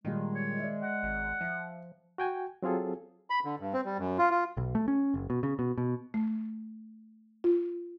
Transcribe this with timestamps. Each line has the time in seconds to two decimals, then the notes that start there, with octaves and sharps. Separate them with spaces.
0.05 A#2 D#3 G3 G#3
0.35 C#5
0.59 D5 E5
0.83 F#5
1.03 G#1
1.41 F3 E5
2.18 F#4 G5 G#5
2.63 F#3 C4 F4 G#4 A4
3.30 B5
3.45 D3
3.60 G2
3.73 C4
3.85 G3
3.98 F#2
4.18 F4
4.31 F4
4.57 B1
4.75 A3
4.88 C#4
5.14 F#1
5.30 B2
5.43 C#3
5.59 B2
5.78 B2
6.14 A3
7.44 F4